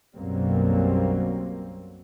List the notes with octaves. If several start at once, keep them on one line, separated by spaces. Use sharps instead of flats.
B1 F#2 F#3 G3 A#3 C4